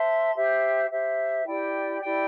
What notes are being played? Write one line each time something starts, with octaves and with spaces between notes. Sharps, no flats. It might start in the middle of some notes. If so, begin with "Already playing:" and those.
Already playing: C5 E5 A5 C6
G4 C5 E5
G4 C5 E5
E4 G4 D5 G5
E4 G4 D5 G5